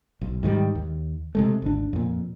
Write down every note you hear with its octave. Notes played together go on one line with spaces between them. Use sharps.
B1
G#2 D#3 F#3 G3
D#2
C3 G#3 A3
G#1 D2 D4
F2 A#2